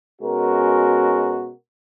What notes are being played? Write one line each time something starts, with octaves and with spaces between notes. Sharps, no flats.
B2 G#3 C#4 F#4 A#4